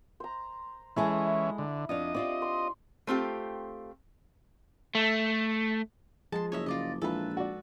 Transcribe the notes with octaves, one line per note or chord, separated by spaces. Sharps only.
C5 A#5
E3 G#3 C#4 E4 G#4 A4
D3
F2 D4 D#5 F5
C4 F4 G4 D5
C6
A3 C4 F4 G4
A3
F3 G#3 A5 C6
F#1 C#5 D#5 E5
C#3 F4 D5 D#5
A#1 E3 G#3 D#4 F4 A4 B4 B5
F#4 D5